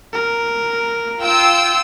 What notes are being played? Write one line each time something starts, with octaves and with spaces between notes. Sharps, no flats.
A#4
F4 G5 E6